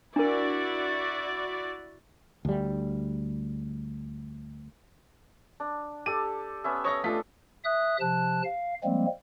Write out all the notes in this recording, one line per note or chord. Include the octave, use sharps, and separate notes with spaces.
D4 E4 F#4 A#4 D5
D2 G3
D4
G4 A4 D5 D#7
B3 C#4 E5
C#5 D#5 C#6 A#6
A3 D4 F4 A4 F#5 B6
E5 D#6 F#6
C3 F3 A5 F#6
F5
F3 G3 G#3 A#3 C4